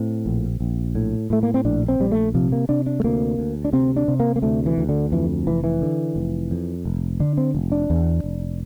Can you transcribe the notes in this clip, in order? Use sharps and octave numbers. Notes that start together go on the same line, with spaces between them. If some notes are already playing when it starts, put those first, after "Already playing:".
Already playing: A2 C4
A#1
A#1
A2
A2 A3
A#3
C4
A#1 D4
C4
A#1 G3
A3
C3 F3
A#3
C3 D4
D4
A3
D2 A#3
D2
D4
C3 C4
D4
C3
A#3
A#3
D2 A3
E3
D2
D3
F2 E3
F1 E3
E3
D3
F1
F2
F1
D3 D4
C4
F1
D4
E2
F1